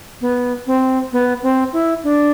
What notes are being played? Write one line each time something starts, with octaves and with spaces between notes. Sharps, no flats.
B3
C4
B3
C4
E4
D4